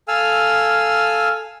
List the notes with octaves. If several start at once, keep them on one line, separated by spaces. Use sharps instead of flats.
A4 F5 G#5 E6 F6